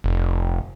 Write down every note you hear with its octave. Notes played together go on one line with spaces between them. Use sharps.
F1